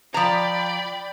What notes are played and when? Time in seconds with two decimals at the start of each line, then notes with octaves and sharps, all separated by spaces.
0.14 F3 D5 G5 A#5 B5